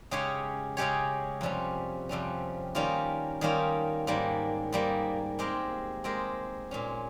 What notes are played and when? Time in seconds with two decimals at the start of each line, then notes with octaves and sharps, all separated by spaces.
0.11 C#3 G#3 C#4 G4 C#5
0.77 C#3 G#3 C#4 G4 C#5
1.41 F2 C3 G3 C#4
2.09 F2 C3 G3 C#4
2.75 D#3 G3 A#3 C#4 F4
3.41 D#3 G3 A#3 C#4 F4
4.07 G#2 G3 A#3
4.72 G#2 G3 A#3
5.39 G#3 C4 G4 A#4
6.04 G#3 C4 G4 A#4
6.71 A#2 G#3 C#4